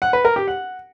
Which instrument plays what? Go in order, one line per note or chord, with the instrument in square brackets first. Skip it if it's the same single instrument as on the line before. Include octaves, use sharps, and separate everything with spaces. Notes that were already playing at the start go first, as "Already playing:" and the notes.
[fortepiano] F#5
B4
A#4
G4
F#5